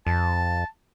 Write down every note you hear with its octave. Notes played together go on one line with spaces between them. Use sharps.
F2 A5